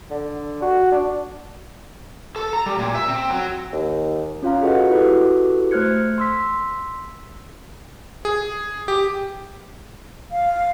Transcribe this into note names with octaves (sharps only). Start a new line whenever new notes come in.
D3
F#4
D4
A4
A#5
G3
A#2
E5
C4
F#3
D#2
C#4 F4 F5 A#5
F#4 G#4 A4 B4 D#5 F#5
E4 F#4 G4 A4 B4
A3 C5 F6 F#6 G#6 C#7
C6 E6 B6
G#4
G4
F5